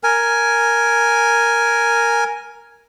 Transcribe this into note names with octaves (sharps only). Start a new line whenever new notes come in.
A#4 G#5